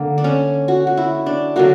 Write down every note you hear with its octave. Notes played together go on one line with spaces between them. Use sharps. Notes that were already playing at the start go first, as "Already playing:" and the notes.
Already playing: D3 A#3
D4
C#4
F#4
F#4
E4
D4
D3 F#3 A#3 F#4